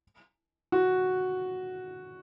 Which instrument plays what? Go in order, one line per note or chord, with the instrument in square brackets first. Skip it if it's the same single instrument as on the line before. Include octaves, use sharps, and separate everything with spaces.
[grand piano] F#4